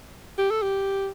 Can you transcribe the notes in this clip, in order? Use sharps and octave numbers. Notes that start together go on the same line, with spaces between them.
G4
A4
G4